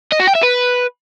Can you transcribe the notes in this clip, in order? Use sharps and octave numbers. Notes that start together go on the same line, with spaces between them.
D#5
F#4
G5
E5
B4